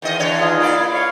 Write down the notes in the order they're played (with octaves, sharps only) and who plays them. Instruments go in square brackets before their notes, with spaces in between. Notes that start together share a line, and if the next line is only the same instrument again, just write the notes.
[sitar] E2 D#3 D#5
E2 D3 C#5
[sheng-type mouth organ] D#4 F4 G#4
[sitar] A#3 E4 D5
[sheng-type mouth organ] C#5 F5